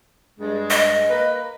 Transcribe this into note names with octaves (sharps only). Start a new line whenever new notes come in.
G2 G#3
D#5
A#3 A#4 B4